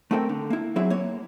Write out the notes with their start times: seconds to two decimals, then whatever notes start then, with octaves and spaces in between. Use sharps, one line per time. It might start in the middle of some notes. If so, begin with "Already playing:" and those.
0.11 A3 C4 E4 A4 A#4 G5
0.29 D3
0.50 A#3 E4
0.76 F#3 C4 E4 G#4 E5
0.90 A#3 C#5